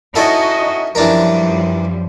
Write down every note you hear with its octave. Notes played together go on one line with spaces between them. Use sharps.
C#4 D#4 E4 F#4 A4 D#5
F#2 E3 F3 G3 D4 A#4